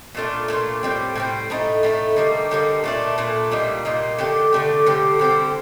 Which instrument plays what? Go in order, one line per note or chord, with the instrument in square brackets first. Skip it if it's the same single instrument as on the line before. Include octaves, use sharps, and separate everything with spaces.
[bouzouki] A#2 A3 D4 F4
A#2 A3 D4 F4
A2 G3 C4
A2 G3 C4
A2 A3 D#4
A2 A3 D#4
D3 G3 A#3 D#4
D3 G3 A#3 D#4
A#2 A3 D4
A#2 A3 D4
A#2 G3 A#3 D#4
A#2 G3 A#3 D#4
D3 A3 D4 G4
D3 A3 D4 G4
D3 G3 C4 G4
D3 G3 C4 G4